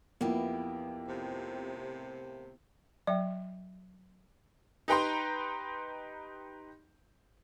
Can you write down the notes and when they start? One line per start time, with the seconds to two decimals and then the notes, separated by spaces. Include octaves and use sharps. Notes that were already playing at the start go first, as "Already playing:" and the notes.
0.21 F2 A#3 B3 E4 G4
1.07 A2 C3
3.07 F#3 D5 E5 G5
4.88 D#4 G4 B4 G5 A#5 C6